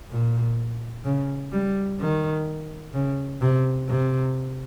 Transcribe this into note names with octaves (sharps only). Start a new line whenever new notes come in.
A#2
C#3
G3
D#3
C#3
C3
C3